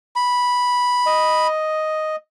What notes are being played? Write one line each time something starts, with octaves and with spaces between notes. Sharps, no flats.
B5
D#5